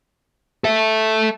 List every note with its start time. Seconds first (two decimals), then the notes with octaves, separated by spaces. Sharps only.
0.64 A4 E5